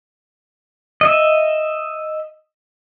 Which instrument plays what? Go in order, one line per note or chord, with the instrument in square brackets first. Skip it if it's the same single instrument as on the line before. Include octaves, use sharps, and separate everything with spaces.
[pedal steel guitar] D#5 E5